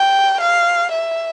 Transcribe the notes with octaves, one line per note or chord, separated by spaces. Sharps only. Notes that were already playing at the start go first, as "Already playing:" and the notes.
Already playing: G5
F5
E5